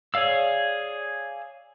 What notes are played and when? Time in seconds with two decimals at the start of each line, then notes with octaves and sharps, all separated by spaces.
0.14 G#4 C#5 D5 F5 E6